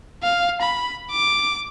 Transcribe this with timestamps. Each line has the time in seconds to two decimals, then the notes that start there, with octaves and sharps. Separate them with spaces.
0.23 F5
0.61 B5
1.11 D6